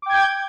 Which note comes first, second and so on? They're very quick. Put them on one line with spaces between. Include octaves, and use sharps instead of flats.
D6 G5 G#6 G6